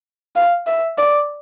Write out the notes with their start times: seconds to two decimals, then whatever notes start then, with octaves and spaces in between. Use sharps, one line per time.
0.36 F5
0.67 E5
0.98 D5